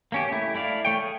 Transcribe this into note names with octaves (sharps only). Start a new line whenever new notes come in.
A#3 C#4 G4
A3 E4
A3 E4 D5 F5
A3 C#5 G5
G#4